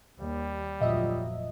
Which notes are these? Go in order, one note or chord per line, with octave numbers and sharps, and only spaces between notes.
D#2 G3
F1 D2 A#2 F3 F#3 F4 D#5 E5